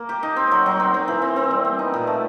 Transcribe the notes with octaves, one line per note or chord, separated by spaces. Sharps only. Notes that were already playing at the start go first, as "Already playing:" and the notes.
Already playing: A#3
G4
D#4
C4
F#3
F#3
C4
C4
E3
C4
C4
G3
B3
D#4
A#2
A3